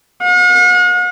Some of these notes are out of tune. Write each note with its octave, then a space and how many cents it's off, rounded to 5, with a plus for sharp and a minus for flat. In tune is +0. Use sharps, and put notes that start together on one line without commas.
F#5 -45